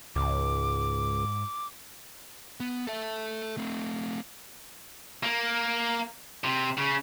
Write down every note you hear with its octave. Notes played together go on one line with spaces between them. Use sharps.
C#2 G#2 D6
B3
A4 E5
A3 C4
A#3
C3
C#3